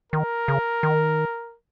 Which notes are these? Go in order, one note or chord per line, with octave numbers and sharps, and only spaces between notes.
D#3 A#4
C#3
D#3